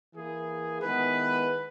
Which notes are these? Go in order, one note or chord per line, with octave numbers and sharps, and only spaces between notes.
E3 A#3 E4 G#4
D#3 G#3 B3 E4 B4